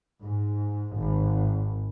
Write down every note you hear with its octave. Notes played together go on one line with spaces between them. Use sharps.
G#2
G#1